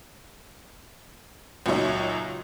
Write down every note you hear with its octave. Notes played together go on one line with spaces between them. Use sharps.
C#2 A#2 F#3 D#4 C#5 E5